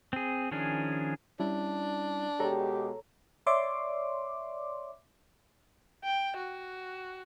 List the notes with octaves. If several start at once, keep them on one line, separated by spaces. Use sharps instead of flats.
C4 G#4
D#3 F3 C#4 D4 G#4
G3 C#4 D4 E4
B2 G#3 G4 A4 C#5 A#5
C#5 D5 E5 C6 D6
G5
F#4